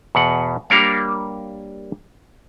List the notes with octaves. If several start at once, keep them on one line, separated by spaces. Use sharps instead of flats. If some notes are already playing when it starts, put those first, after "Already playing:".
E2 B2 F#5
G3 A#3 D4 A#4 C#5 F5